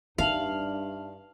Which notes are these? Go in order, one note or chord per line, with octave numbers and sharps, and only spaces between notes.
G2 D#4 E5 F5 A5 F#7